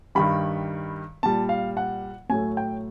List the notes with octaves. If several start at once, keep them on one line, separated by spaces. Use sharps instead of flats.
G2 D#3 G3 B5
A#2 G3 A5
F5
F#5
A2 F#3 A3 G#5
G5